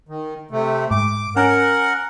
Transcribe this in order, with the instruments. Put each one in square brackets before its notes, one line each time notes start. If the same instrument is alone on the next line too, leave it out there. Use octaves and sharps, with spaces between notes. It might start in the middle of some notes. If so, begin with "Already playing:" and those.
[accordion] D#3
C3 A3
[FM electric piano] G#2 [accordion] D6
[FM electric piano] C#4 G#5 A#5 [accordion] A#4 F#5